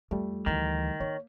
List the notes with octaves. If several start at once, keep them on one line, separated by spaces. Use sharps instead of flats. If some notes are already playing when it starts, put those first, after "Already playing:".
F2 G3 A3
D2 D#3 E3
A#3 C#5